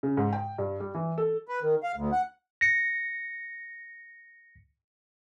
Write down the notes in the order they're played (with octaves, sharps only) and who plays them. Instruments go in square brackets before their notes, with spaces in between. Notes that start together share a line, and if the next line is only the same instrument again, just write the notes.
[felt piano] C#3
G#2
G5
G2
G3
E3
A4
[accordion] B4
D#3
F5
D2
F#5
[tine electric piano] A#6 C#7